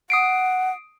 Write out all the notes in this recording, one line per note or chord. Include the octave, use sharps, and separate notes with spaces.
F#5 D#6 C7 D7